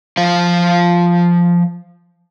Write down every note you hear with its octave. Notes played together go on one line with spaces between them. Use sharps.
F3 C5 F5